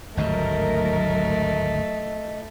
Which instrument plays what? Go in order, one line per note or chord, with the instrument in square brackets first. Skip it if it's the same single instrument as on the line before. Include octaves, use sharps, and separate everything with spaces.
[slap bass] G#1 D2 G2 [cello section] F#3 A#4 [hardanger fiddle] A3 [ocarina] D#5